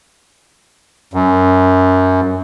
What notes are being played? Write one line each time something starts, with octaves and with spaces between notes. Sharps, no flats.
F#2